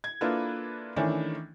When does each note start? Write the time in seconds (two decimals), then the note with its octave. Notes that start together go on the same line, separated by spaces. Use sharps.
0.04 G#6
0.21 A#3 D4 E4 F4 A4 B4
0.96 D#3 E3 A3 C#4 D4 E4